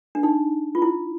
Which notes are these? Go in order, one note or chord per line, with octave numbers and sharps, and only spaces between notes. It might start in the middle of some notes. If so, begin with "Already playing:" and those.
D4
D#4
F4
E4